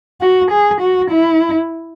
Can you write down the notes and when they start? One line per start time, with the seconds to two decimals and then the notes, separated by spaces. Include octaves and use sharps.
0.21 F#4
0.51 G#4
0.81 F#4
1.11 E4